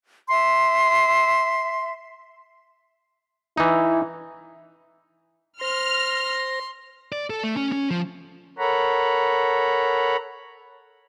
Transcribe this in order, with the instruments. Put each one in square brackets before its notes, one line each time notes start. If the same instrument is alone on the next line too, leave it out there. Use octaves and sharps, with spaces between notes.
[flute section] E5 C6
[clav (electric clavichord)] E3 D#4 [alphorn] E4
[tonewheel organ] C5 A#6 [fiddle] C6 [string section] F6
[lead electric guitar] D5
A4
A3
C#4
C#4
F3
[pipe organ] A4 A#4 C#5 F#5 A#5 B5